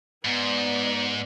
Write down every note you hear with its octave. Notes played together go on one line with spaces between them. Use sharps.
G#2 B3 D5